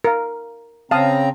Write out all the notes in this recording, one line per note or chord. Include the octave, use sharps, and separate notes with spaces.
A#4 F5
C#3 C4 F5 A5 A#5 D#6